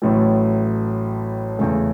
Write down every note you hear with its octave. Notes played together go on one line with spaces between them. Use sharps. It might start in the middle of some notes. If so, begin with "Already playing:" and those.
A1 A2 F#3 A3
E2 C#3 A3